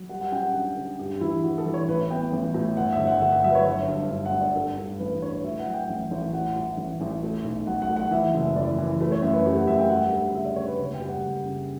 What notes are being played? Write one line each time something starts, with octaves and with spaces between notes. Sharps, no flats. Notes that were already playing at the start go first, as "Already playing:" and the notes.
Already playing: F#3
G3 F#5
F#5
C#4 G5
F#5
D3 F#5
D3
G2 G4
E3 E4
E3 F#4
A4
E3
C#5
A1 B4
B3 G5
A1
A2
G1 F#5
E5
G1
F#5
G1 F#5
E5
F#3 E5
B4
C#5
G1 E5
G2
G2
F#5
G2
D5
G2 A4
G2
A1 B4
B4
D3 C#5
C#5
A2 E5
F#5
F#3
G5
A1
A1
A2 F#5
A2
A1
A1
A3
B1
F#3 F#5
F#5
A3
F#5
E3 E5
F#1
E3 D5
E3
A3 B4
C#5
F#2 E5
B4
A3 G4
F#5
F#2 E5
G5
G3 F#5
D2
C#3 E5
D5
D2 C#5
B4
F#1 C#5
G5
G3
F#5
F#1
C#3